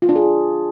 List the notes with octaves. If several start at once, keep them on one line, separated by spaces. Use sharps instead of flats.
F4
D4
G#4